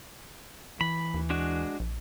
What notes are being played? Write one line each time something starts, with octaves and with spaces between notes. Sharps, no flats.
E3 B5
D#2
G#3 D4 F#4
A#1